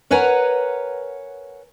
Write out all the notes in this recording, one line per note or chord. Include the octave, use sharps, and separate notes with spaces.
A#4 B4 C#5 F#5 G#5 A#5